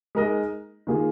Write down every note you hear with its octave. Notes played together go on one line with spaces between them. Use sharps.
G#3 D#4 A#4 D#5
D#3 A#3 F4 G#4